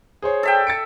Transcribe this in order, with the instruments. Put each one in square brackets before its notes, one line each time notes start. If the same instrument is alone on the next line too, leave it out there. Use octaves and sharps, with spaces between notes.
[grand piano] G#4 C5 C#5
[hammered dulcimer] A4 E5 G5
[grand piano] A6 C#7 D7